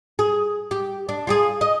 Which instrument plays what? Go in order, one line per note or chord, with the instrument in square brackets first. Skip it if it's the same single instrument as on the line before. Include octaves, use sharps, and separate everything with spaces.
[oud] G#4
G4
D4
F4 G4 G#4
D#5